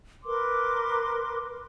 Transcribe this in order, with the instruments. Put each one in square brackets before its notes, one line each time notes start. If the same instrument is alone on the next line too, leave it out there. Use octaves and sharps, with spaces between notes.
[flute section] A#4 B4 C6 D6